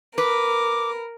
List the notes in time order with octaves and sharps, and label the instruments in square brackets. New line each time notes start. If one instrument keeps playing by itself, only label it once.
[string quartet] A#4 [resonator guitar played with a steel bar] B4 [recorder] D6